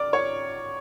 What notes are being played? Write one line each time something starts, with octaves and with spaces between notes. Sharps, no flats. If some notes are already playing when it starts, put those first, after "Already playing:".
Already playing: D5 D6 F6
C#5 C#6